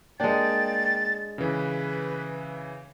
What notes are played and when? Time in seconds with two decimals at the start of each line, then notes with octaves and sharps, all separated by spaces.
0.20 G#3 A#3 D4 D5 G5 A6
1.38 C#3 E3 B4